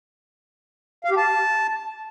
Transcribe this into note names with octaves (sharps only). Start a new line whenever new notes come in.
F5
G4
A5